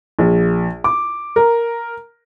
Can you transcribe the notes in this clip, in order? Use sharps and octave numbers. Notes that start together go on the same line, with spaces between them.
A#1
D6
A#4